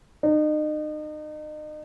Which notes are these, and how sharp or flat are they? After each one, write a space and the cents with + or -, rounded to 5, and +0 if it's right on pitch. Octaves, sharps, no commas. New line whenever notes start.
D#4 -35